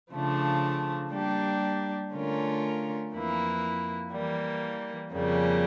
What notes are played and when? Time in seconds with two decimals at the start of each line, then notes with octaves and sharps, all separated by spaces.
0.13 C#3 F3 A3 D4
1.12 G3 A#3 D4 G4
2.13 D3 A3 C#4 F4 A#4
3.13 F2 E3 A#3 E4
4.13 E3 G3 A#3
5.13 F2 C#3 G3 A#3